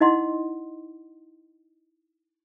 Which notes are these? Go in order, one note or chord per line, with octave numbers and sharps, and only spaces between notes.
D#4 E4 D#5 F#5 C6